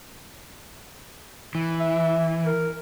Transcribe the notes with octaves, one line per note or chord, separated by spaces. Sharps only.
E3
E5
A#4